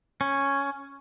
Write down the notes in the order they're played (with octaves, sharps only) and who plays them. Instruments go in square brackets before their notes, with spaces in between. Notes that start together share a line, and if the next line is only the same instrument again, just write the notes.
[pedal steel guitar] C#4